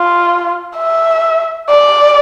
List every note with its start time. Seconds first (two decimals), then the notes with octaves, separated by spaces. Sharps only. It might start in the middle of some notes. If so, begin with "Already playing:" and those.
Already playing: F4
0.78 E5
1.70 D5